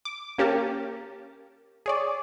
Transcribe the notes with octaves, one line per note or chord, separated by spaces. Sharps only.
D6
A#3 C#4 G4 A#4 A5
G#4 C#5 D5